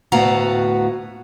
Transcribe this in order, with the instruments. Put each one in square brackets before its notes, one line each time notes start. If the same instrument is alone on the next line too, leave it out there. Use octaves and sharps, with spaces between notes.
[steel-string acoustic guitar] D2 A2 B3 F#4 F5 A#5